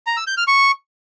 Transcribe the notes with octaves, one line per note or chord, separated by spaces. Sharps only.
A#5
E6
G6
F6
C#6